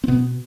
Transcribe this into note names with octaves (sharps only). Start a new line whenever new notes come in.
C4
B2 B3